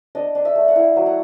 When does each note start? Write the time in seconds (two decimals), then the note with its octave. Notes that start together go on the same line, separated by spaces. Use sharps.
0.15 D4 D#5
0.35 D4
0.45 E5
0.55 A3
0.68 F#5
0.75 E4 F5
0.96 F#3
1.06 F#5